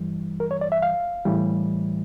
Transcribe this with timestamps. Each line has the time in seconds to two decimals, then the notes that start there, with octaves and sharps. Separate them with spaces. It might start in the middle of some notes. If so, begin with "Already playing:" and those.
Already playing: G2 E3 G3
0.40 A#4
0.51 C#5
0.61 D5
0.72 E5
0.82 F5
1.25 A2 E3 G3